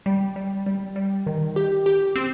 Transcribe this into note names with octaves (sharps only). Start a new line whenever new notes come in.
G3
G3
G3
G3
D#3
G4
G4
C4